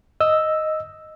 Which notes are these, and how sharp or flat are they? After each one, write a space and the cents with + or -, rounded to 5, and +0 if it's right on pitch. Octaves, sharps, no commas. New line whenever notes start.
D#5 +0 E6 +0